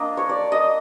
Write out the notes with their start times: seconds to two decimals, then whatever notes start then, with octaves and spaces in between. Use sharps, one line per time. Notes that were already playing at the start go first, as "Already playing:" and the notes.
Already playing: A#3 D4 F4 D#5
0.17 C#5
0.29 D5
0.52 D#5